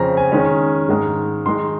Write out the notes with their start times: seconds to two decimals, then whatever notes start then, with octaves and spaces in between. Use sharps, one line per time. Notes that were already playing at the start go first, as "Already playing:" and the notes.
Already playing: F2 C#3 F3 C4 A#5
0.17 G#5
0.32 D#3 G#3 C#4
0.89 G#2 D#3 G#3
1.46 D#3 G#3 D#4 C6